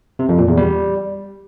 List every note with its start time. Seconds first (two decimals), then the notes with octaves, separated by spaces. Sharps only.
0.19 C3
0.29 F2
0.38 A#2
0.48 E2
0.57 G3